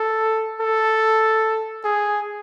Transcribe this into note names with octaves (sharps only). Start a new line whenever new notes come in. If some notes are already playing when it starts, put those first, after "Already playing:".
Already playing: A4
A4
G#4